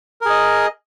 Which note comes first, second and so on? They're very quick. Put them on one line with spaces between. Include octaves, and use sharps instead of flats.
A#4 G#4 D#5